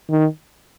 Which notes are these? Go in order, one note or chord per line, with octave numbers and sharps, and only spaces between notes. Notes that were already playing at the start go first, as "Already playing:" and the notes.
D#3